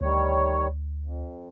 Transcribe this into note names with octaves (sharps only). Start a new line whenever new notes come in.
D2 D#3 G3 C#5
F2